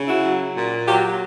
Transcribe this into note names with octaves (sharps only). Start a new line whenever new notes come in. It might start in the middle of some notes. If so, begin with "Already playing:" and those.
Already playing: C#3
E4 F#4
F#3
A#2
F#3 F4 G4